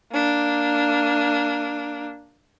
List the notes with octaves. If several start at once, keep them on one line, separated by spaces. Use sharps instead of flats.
A#3 D4